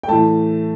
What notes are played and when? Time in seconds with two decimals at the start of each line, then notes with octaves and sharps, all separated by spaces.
0.03 G5
0.08 A2 E3 A3 A5